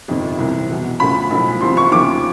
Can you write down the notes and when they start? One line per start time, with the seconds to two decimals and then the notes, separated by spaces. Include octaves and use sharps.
0.08 G1 F2 C3 D#3
0.38 C2 C3 E3
0.69 E2 B2
1.00 D2 C#3 F3 B5
1.31 B1 A2 F3
1.61 E2 C3 F3 C6
1.77 C#6
1.91 D#2 C#3 F3 D6